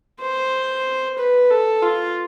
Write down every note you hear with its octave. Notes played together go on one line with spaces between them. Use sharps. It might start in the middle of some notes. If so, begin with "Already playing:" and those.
C5
B4
A4
F4